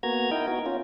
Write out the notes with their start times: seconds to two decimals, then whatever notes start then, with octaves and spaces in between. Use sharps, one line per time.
0.03 A#3 B3 F#4 A#5 G#6
0.31 D#4 E4 A#4 D#5 G5
0.48 B3 F#4
0.66 C#4 F4